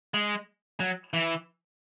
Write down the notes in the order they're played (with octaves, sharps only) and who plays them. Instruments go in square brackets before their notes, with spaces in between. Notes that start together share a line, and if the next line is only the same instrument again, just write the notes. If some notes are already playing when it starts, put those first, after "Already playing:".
[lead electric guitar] G#3
F#3
E3